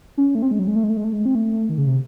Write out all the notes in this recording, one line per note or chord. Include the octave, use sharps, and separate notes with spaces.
C#4
A3
C4
G#3
F#3
G#3
A3
G#3
A3
G#3
A3
G#3
C4
A3
D#3
C#3
C3